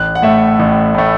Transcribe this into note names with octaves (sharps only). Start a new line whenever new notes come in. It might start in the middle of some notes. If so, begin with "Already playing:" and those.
Already playing: A1 F#6
F#5
A2 A3 E5
A1
A2 A3